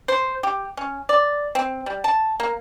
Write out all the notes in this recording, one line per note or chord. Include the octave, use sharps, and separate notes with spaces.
C5
G4
C#4
D5
C4
G3
A5
A#3